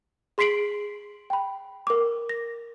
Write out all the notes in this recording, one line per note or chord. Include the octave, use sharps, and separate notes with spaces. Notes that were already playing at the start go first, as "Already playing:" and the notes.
G#4 C6 B6 C7 D7 F#7
G5 B5
A#4 D6
A#6